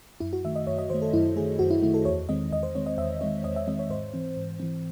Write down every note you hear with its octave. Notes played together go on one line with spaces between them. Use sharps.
F#2 E4
F#4
D#3 A3 E5
D#5
F#2 C#5
D#5
D#3 A3 C5
A4
F#2 E4
D#3 A3 G#4
F#2 F#4
E4
D#3 A3 E4
A4
E2 C#5
D#3 G#3 C4 D#5
E2 D#5
C5
D#3 G#3 C4 C#5
D#5
E2 E5
D#3 G#3 C4 C#5
E2 D#5
E5
D#3 G#3 C4 D#5
C#5
G#2 C5
E3 C4
G#2
E3 C4